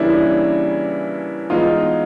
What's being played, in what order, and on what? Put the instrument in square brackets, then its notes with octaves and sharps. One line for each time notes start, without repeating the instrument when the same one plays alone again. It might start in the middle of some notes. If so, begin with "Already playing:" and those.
Already playing: [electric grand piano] C#3 E3 G3 A#3 C#4 [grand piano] D4 E4
[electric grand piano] E3 G#3 B3 [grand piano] D#4 F4